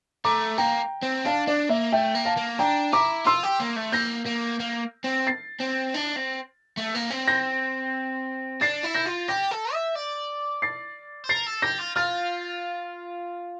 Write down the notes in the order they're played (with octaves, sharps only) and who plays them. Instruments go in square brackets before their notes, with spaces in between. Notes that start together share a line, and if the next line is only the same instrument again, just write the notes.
[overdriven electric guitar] A3 [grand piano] A#5 D6
[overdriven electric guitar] A#3 [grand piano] G5 A#5
[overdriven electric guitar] C4
[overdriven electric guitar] D4 [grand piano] F5 A5
[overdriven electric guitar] D4 [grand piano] D5
[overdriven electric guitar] A#3 [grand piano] E5
[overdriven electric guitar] A3 [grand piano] E5 G5
[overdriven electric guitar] A#3
[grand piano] F5 A5
[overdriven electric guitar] A#3
[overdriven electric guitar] D4 [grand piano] G5 A#5
[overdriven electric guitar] E4 [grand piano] A#5 D6
[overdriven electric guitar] F4 [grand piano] C6 E6
[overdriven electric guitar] G4
A#3
A3
[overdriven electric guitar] A#3 [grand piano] G6 A#6
[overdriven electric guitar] A#3
A#3
C4
[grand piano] A6 C7
[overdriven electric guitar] C4
D4
C4
A3
A#3
C4
[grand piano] G6 A#6
[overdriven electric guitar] D4 [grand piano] A6 C7
[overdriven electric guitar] E4
[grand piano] G6 A#6
[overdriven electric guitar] F4
[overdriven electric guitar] G4 [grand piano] G6 A#6
[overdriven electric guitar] A4
E5
D5
[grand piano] A6 C7
[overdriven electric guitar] C5
[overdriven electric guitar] A#4 [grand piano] A6 C7
[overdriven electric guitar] A4
[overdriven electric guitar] G4 [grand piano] G6 A#6
[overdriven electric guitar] F4
[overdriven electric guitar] F4 [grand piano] F6 A6